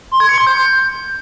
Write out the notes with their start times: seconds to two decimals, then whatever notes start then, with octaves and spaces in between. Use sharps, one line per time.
0.11 C6
0.20 G#6
0.29 C#7
0.38 C6
0.47 G6